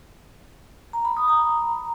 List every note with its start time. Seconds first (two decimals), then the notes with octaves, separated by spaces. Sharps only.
0.93 A#5
1.05 B5
1.17 D#6
1.28 A#5